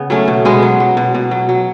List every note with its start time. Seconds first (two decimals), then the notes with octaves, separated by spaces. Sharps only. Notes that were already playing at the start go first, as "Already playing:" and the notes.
Already playing: C#3 B3
0.10 F#3 A3 C#4
0.28 B2
0.45 B2 G#3 B3
0.63 F#3
0.80 F#3
0.97 B2
1.15 B2
1.31 F#3
1.49 F#3